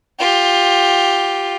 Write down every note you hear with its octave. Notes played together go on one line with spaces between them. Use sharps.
F4 G4